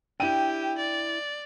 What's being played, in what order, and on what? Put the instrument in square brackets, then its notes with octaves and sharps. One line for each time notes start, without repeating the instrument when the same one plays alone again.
[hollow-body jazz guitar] D4 E4 [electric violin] G4 [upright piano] G5 D#7
[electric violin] D5